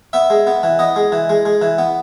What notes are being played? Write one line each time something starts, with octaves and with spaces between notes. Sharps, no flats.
B3 E5
G#3
B3
E3
B3 D#5
G#3
E3
G#3
G#3
E3
B3